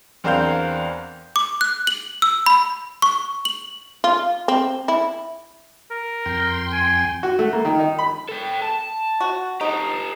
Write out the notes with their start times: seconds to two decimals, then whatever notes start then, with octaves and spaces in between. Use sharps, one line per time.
0.24 E2 C4 D4 A#4 F5 G6
1.36 D6
1.61 F#6
1.87 F#7
2.22 E6
2.46 B5
3.02 C#6
3.45 F#7
4.04 F4
4.48 C4
4.88 E4
5.90 A#4
6.26 F2 G5 C6
6.73 G#5
7.23 F#4
7.39 A3
7.53 A#3
7.65 D#3
7.79 D#4
7.99 B5
8.29 A4 G5
8.62 A5
9.20 F#4
9.61 D#4 G4 A4